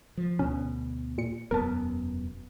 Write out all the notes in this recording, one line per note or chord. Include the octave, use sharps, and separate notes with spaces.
F3
D2 B2 C#4
A#2 C#7
E1 F#2 B3 A#4 A5